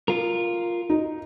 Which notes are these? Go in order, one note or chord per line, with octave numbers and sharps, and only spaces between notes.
F4 A#4
D#4